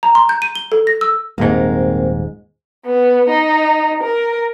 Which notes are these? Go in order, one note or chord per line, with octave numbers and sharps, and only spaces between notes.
A#5
C6
G6
D#7
G7
A4
A#6
E6
D#1 G#2 A#3 C4
B3
D#4
A#4